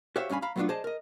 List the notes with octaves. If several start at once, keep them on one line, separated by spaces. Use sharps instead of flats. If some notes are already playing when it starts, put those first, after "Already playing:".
F#4 G4 C5 C#5 E5 F5
G2 C#4 F5 G#5 B5
F5 A#5 B5
F#3 A3 B3 C4 D4 F4
G#4 C5 D5 D#5 A5
A#4 D#5